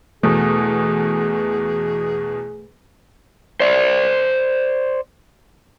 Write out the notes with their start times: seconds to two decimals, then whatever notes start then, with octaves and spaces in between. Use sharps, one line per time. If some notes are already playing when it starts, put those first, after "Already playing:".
0.23 E2 B2 A3 G#4
3.60 C5 D5